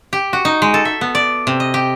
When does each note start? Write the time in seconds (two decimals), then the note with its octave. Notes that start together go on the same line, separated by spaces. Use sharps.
0.13 G4
0.33 F#4
0.45 D#4
0.62 G#3
0.74 A4
0.85 E5
1.01 B3
1.15 D5
1.47 C3
1.60 D#5
1.74 G4